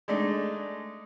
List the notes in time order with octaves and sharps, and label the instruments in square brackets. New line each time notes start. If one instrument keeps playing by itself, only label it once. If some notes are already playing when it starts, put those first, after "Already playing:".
[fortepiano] G#3 A3 D4 D#4